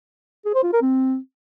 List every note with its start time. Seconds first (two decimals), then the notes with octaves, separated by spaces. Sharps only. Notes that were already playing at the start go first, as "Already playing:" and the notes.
0.45 G#4
0.54 C5
0.64 F4
0.73 A#4
0.82 C4